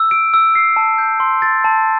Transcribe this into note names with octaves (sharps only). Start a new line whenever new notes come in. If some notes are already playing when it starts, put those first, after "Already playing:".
Already playing: E6
D7
E6
C7
A5
G6
C6
A6
A5